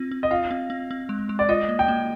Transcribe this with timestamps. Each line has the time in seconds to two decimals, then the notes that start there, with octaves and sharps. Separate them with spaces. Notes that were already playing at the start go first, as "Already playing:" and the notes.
Already playing: C4 F4
0.11 C4
0.23 D#5
0.31 F4 F5
0.51 C4
0.70 C4
0.91 C4
1.09 G#3
1.29 G#3
1.39 D5
1.49 F4 D#5
1.69 A#3
1.79 G5
1.88 A#3